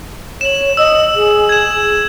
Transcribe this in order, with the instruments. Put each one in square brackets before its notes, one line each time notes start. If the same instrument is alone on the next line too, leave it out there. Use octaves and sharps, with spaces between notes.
[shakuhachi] C#5 [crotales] E7 F#7
[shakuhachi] D#5 [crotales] E6
[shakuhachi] G#4
[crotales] G#6 E7